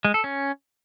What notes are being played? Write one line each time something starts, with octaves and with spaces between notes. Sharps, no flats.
G#3
A4
C#4